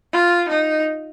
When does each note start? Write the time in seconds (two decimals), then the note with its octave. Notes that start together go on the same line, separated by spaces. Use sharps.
0.13 F4
0.49 D#4